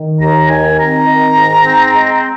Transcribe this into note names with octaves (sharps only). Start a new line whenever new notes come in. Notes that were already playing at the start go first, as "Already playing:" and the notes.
Already playing: D#3
D#2 A#5
D#3 G#5
C4 A#5
D#3
G#2
C4
G#3